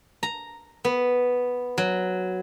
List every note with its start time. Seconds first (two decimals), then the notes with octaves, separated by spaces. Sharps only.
0.23 A#5
0.85 B3
1.78 F#3